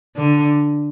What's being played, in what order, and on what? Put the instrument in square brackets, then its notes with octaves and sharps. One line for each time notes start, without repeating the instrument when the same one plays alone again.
[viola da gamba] D3